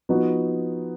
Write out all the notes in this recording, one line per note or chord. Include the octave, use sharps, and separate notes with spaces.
F3 B3 D#4 F#4